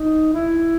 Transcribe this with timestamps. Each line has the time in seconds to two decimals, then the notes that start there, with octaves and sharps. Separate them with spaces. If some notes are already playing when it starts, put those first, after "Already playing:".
Already playing: D#4
0.34 E4